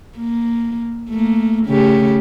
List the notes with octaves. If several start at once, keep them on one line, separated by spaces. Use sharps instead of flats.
A#3
A3 A#3
C#3 A3 G4